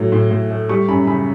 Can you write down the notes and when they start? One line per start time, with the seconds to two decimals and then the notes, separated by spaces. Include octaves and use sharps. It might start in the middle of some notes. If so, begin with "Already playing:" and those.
Already playing: A2 F#3 A3
0.12 A2
0.31 A2
0.51 A3
0.69 G3 C#6
0.88 F#2 B5
1.07 C#3 B5